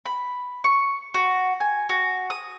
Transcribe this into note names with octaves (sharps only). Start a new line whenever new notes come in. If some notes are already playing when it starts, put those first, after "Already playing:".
B5
C#6
F#4
G#5
F#4
D#6